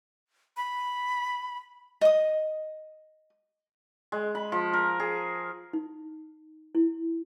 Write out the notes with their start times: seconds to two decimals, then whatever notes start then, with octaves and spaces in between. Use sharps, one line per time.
0.57 B5
2.01 D#5 D#6
4.12 G#3
4.35 B5
4.52 F3
4.73 A#4
5.00 G#4
5.73 D#4
6.75 E4